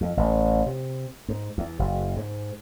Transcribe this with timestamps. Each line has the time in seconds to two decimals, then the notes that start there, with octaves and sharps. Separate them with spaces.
0.01 F2
0.17 A1
0.66 C3
1.28 G#2
1.58 E2
1.79 F#1
2.17 G#2